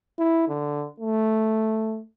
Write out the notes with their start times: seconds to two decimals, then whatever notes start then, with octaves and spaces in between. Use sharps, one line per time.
0.19 E4
0.48 D3
1.00 A3